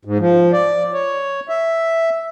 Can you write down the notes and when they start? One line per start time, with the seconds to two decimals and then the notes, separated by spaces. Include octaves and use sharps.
0.05 G#2
0.19 F3
0.53 D5
0.93 C#5
1.49 E5